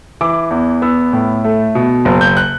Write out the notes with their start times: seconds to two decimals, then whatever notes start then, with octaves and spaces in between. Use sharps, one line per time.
0.21 E3 D6
0.51 E2
0.82 B3 E6
1.13 A2
1.44 A3
1.75 B2
2.05 F#1
2.21 G6
2.37 F#6